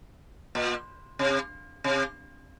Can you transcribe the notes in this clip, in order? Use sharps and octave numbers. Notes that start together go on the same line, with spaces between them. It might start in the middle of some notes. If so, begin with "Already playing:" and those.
A#2
C3
C3